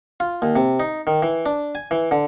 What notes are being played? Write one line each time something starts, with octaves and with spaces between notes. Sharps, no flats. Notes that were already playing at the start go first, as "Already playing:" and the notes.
F4
D#2
C3
D#4
D#3
E3
D4
G#5
E3
D3